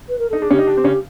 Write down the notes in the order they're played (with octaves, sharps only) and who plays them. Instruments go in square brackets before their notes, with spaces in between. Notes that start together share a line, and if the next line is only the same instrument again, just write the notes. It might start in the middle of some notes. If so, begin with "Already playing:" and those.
[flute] B4
A#4
[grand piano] D#4 [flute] A4
[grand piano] D4 [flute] G#4
[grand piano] C#3 C#4 [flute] G4
[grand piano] D#4
D3 D4
C4
C#3 C#4